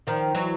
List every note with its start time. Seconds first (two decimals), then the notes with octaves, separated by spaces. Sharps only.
0.07 D#3 F3
0.35 E3 F#3